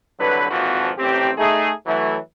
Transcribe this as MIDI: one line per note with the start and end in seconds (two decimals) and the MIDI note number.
0.19 0.50 36
0.19 0.50 50
0.19 0.50 54
0.19 0.50 71
0.50 0.90 32
0.50 0.90 41
0.50 0.90 46
0.50 0.90 52
0.50 0.90 53
0.50 0.90 66
0.98 1.31 33
0.98 1.31 60
0.98 1.31 67
1.38 1.71 57
1.38 1.71 63
1.38 1.71 68
1.86 2.17 52
1.86 2.17 54
1.86 2.17 57